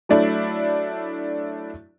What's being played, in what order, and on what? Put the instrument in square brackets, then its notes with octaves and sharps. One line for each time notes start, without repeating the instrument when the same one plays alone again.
[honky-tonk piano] F#3 A3 D4 E4